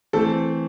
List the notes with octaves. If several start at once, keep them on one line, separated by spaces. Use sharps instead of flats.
E3 A3 C4 A4